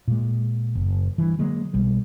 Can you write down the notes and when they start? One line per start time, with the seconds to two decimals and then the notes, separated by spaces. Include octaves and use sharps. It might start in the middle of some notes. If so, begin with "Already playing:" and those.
0.08 A#2 G#3
0.75 F#1
1.18 G2 E3
1.39 D3 F#3 G#3 A#3
1.73 B1 G3 G#3